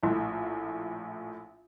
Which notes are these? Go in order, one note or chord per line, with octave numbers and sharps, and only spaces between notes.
A#1 A2